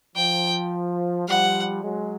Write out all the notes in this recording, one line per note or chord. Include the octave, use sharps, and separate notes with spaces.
F3 G5
F3 G3 F#5
F#3 G#3